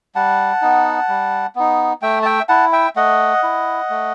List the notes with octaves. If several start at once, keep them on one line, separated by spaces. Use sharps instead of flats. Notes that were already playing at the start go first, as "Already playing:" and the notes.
G3 F#5 A5
B3 D#4
G3
B3 D#4
A3 E5 G5
A5
E5 G5
E4 F#5 A5
E5 G5
A3 D#5 F#5
E4
A3